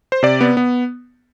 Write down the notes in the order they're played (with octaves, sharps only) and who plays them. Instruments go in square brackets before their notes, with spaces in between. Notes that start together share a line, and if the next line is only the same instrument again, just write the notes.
[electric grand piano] C5
C3 D5
B3
B3